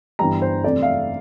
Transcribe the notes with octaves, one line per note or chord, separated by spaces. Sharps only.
G1 G2 E3 G3 A#5
C5
F2 C3 E3 A3 D5
F5
E5